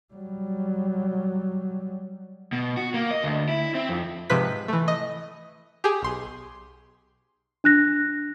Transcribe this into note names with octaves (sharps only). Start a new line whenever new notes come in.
F#3 G3
B2
F#4
A#3
D#5
D2
E4
C4
F2
G#2 C3 F3 B4 B6
E3 A3
D#5
G4 G#4
B1 C6
D4 F#6 A#6